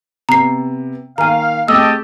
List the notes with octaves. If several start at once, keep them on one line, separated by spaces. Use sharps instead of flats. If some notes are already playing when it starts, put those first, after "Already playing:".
C3 B3 A#5 C7
D#3 A#3 F5 G#5 A#5
A3 C4 G4 G#4 D#5 A5 E6